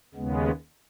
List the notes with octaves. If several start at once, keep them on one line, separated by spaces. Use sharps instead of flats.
D#2 C#3 G#3 B3